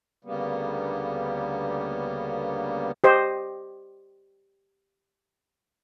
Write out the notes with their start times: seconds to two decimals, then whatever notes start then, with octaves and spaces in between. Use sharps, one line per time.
0.25 D2 C#3 G3 A#3 B3
3.04 G4 C5 D#5